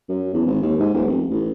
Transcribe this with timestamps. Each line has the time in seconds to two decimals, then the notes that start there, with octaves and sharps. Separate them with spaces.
0.09 F#2
0.34 E2
0.46 G#1
0.62 D#2
0.80 G#2
0.94 D#1
1.08 F1
1.31 A1